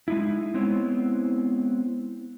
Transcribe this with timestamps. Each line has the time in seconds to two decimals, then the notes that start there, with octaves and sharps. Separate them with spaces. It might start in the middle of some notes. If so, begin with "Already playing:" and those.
0.08 G#3 D#4 E4
0.54 G#3 B3 C4 E4 C#5